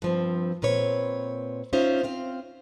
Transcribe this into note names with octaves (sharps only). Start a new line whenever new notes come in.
G2 F3 C4
A#2 C4 B4 C#5
C#4 D#4 F4 C5 E5
C4 F4 F5